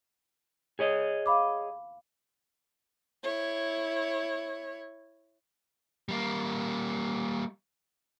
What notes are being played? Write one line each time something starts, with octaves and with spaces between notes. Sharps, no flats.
G#4 C#5 D#5
F5 B5 D6
E4 C#5
G3 A#3